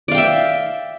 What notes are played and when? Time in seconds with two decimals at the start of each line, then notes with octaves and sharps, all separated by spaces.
0.08 D5
0.11 F5
0.15 G5
0.18 E5